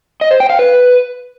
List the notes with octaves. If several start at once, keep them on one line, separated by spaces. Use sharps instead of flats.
D#5
C5
G5
F5
B4